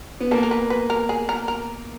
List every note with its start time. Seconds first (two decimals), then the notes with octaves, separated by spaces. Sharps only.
0.20 B3
0.31 A#3 A4
0.43 A#4
0.51 B4
0.70 B4
0.90 A#4
1.09 G#4
1.29 A#4
1.48 A#4